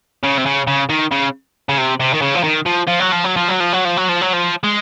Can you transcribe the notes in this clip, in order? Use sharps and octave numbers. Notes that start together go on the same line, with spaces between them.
C#3
C3
C#3
C#3
D#3
C#3
C#3
C3
C3
D#3
C#3
F3
D#3
F3
F3
F#3
F3
F#3
F3
F#3
F3
F#3
F3
F#3
F3
F#3
F3
G#3